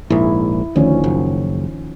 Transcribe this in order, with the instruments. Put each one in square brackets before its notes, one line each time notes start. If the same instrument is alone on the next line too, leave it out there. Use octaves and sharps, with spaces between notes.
[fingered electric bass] A#1 G#2 [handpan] E4
[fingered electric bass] D2 [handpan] D#3 F3 C#4
[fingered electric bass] F#1